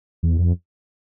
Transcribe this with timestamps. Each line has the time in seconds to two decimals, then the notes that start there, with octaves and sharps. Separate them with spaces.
0.23 E2
0.38 F2